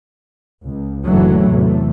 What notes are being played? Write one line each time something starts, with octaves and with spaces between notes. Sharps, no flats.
C#2
F#1 A2 D3 E3 F#3 A3
E2 A2 C3 A3